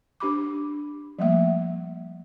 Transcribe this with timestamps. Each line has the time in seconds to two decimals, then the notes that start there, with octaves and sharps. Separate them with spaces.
0.20 D4 G4 B5 D6
1.19 F3 G3 A3 A#3 E5